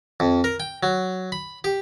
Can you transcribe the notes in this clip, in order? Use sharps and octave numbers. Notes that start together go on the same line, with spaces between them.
F2
A#4
G5
F#3
B5
G4